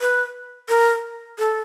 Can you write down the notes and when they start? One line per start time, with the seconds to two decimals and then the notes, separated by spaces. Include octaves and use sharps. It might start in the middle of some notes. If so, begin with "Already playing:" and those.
0.01 B4
0.69 A#4
1.39 A4